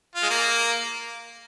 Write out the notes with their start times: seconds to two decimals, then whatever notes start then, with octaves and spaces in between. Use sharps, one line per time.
0.16 F4
0.23 G#3
0.30 A#3